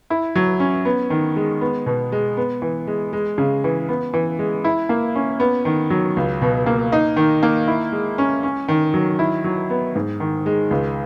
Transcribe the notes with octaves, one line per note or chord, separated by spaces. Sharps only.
E4
F#3
C#4
B3
D#3
G#3
B3
B2
G#3
B3
E3
G#3
G#3
C#3
E3
B3
E3
G#3
E4
A#3
C#4
B3
D#3
F#3
C#2
B2
A#3
D#4
D#3
A#3
E4
G#3
C#4
C#4
D#3
F#3
E4
F#3
B3
G#2
D#3
G#3
C#2